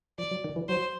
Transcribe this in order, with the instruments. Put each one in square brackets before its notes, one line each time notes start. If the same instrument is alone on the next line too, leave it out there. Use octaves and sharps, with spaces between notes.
[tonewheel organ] F3 [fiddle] D5
[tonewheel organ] F#3
D#3
E3
[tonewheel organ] F#3 [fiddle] C5